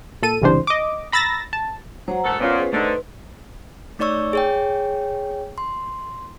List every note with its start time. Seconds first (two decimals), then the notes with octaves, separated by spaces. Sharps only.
0.23 A#2 A4 D#7
0.41 G1 C#2 C3 E3 D4 C5
0.67 D#5 D6
1.12 A#5 B5 E6 A6 A#6
1.53 A5
2.08 F#3 C5 F#5 A#5
2.24 E1 A3 F#4 A4
2.40 A#2 B3 C#4 F4
2.58 G#4 B4 C5
2.73 D3 A3 D#4 B4 C5 C6
2.88 B4
3.99 A3 D#4 C#5 D5 C#6 E6
4.33 G#4 C#5 G5
5.58 C6